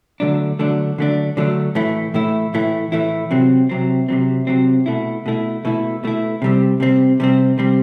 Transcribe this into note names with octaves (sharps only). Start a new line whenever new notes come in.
D3 F#3 A3 D4
D3 F#3 A3 D4
D3 F#3 A3 D4
D3 F#3 A3 D4
A2 E3 A3 E4
A2 E3 A3 E4
A2 E3 A3 E4
A2 E3 A3 E4
C3 F#3 C4
C3 F#3 C4
C3 F#3 C4
C3 F#3 C4
B2 A3 E4
B2 A3 E4
B2 A3 E4
B2 A3 E4
C3 G3 C4
C3 G3 C4
C3 G3 C4
C3 G3 C4